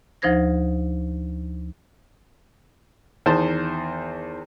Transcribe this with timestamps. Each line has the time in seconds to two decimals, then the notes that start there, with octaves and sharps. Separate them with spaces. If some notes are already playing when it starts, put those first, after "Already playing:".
0.22 D2 F3 D#4 C5 G#6 A#6
3.26 E2 D#3 C5 A5